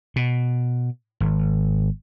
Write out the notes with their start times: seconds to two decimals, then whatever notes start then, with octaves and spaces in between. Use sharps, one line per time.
0.16 B2
1.20 G#1